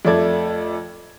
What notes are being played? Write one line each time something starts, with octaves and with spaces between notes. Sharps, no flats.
F2 A3 A4 D5 G#6